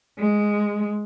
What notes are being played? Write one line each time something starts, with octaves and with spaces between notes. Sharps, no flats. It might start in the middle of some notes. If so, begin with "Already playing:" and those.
G#3